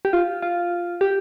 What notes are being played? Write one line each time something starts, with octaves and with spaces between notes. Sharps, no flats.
G4
F4
F4
G4